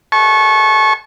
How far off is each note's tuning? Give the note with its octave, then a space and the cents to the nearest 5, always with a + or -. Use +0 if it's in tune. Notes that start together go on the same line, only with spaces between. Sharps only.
A5 -35 C#6 -20